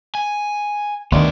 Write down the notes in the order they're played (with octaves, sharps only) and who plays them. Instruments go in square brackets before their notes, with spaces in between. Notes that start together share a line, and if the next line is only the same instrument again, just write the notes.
[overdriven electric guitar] G#5
[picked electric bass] D2 D#3 [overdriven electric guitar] B3 D5